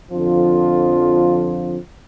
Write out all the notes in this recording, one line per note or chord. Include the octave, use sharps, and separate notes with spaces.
F2 D3 F3 F4